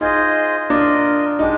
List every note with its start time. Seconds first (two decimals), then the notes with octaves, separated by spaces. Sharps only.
0.01 D#4 F4 G#4 C5 D#5
0.70 D4 F4 A#4 D#5
1.39 G#3 D4 D#4 G4